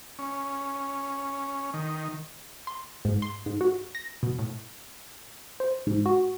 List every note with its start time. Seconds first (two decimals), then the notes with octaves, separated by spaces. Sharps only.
0.19 C#4
1.74 D#3
2.67 C6
3.05 G#2
3.22 C6
3.46 G#2
3.61 F#4
3.95 A#6
4.23 B2
4.39 A2
5.60 C5
5.87 G#2
6.06 F#4